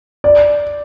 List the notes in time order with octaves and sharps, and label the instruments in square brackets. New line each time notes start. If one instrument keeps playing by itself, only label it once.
[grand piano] D5